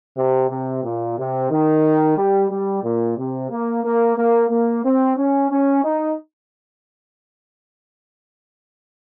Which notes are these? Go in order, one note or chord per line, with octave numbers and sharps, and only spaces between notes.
C3
C3
A#2
C3
D#3
G3
G3
A#2
C3
A#3
A#3
A#3
A#3
C4
C#4
C#4
D#4